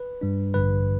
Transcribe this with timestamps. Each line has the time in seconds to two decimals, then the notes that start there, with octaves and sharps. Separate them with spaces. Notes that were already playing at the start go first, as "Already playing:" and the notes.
Already playing: B4
0.21 G2 G3 D4
0.54 A1 G2 D3 B4